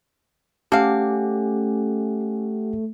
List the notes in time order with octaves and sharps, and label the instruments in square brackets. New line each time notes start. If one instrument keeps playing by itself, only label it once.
[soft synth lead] A3 [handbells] C#4 [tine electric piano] G4 F#5 [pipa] A4 F5